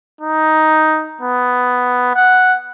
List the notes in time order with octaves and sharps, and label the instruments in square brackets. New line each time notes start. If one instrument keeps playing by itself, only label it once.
[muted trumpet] D#4
B3
F#5